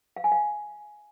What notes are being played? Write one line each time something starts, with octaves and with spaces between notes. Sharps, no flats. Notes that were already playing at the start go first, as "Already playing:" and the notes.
F5
G#5
F5